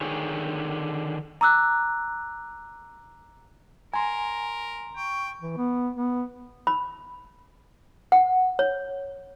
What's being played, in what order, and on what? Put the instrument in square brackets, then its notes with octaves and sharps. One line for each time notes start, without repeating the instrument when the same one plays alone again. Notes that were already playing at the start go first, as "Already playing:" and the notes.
[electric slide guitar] D3 D#3 G#4 C#5
[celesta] A#5 D6 E6 F#6
[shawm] A#4 [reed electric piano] G#5 [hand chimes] A#5 C6
[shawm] G5 [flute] C#6
[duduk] E3
B3
B3
[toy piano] B5
F#5
C#5